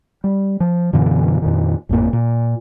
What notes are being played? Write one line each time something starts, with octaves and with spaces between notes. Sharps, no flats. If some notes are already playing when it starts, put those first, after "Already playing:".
G3
F3
F#2 B2 D3 E3
F2 A#2 D#3
G#1 F2 A2 A#3
A#2